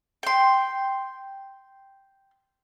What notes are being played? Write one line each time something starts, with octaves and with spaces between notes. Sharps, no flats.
G5 C6